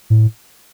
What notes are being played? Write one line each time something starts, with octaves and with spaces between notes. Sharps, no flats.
A2